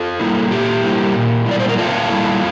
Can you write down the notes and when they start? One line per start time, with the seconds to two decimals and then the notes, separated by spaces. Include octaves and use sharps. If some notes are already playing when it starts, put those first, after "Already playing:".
Already playing: F4 A4
0.20 G3 A#3 E4
0.51 A#2 G4
0.83 G3 A#3 E4
1.15 A#2
1.46 G3 A#3 E4 D5
1.60 C5
1.69 A#4
1.77 A#2 F4 A4
2.09 G3 A#3 E4